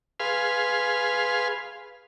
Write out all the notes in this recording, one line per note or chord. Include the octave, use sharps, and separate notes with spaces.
G#4 B4 F5 C6